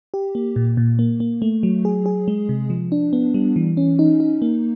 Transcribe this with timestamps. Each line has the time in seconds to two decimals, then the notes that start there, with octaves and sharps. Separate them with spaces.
0.14 G4
0.35 A#3
0.56 A#2
0.77 A#2
0.99 A#3
1.20 A#3
1.42 A3
1.63 F#3
1.85 G#4
2.06 G#4
2.28 G#3
2.49 C3
2.70 F3
2.92 D4
3.13 B3
3.34 G3
3.56 E3
3.77 C#4
3.99 D#4
4.20 D#4
4.42 A#3